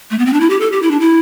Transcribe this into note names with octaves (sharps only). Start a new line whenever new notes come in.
A3
B3
C4
D4
E4
G4
A4
G4
E4
D4
E4